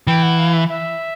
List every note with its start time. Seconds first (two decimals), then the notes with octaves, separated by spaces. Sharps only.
0.07 E3 G5
0.23 F#5
0.39 F5
0.53 E5
0.69 E5